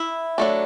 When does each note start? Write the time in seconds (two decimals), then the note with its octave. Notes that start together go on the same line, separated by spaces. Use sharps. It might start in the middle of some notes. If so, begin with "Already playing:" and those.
Already playing: E4
0.38 F#3 A3 D4